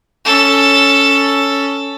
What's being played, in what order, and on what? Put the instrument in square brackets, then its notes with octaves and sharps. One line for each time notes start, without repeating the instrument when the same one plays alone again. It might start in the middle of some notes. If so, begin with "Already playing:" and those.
[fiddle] C#4 A4